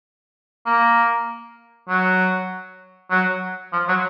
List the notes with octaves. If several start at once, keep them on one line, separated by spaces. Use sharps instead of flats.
A#3
F#3
F#3
F3
F#3